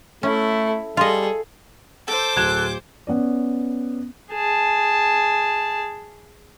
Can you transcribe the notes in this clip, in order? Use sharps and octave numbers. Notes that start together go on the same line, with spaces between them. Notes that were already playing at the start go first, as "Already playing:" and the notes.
A3 C#4 E4 A4
G3 F4 G#4 A4 D#5
A4 C5 D6 G6
D1 F#6 G#6 E7
B3 C#4 D5
G#4 A5